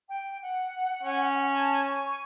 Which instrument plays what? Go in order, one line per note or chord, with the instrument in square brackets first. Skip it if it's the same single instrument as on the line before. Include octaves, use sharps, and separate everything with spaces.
[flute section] G5
F#5
[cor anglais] C#4
[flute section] A5
G#5 C#6